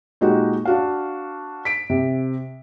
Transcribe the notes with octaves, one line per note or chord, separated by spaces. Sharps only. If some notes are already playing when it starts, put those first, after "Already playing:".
A#2 G#3 D#4 F#4 G4
D4 F#4 F5
B6 D7
C3